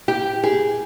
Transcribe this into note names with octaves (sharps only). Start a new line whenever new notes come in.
G4
G#4